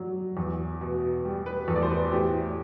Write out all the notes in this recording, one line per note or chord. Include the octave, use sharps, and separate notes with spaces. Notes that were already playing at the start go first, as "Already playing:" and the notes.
Already playing: F#3 D5
E2
B2
G3
B4
E2 A4
D5
C5
B4
A2 G4